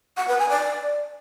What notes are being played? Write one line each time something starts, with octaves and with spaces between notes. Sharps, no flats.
F#5
B4
G#5
D5